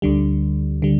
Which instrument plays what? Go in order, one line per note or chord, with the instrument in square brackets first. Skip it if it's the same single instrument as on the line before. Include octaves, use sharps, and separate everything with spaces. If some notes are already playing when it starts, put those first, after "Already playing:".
[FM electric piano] D2 D3 G3
D3 G3